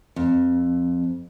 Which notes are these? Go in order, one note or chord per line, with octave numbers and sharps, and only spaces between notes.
F2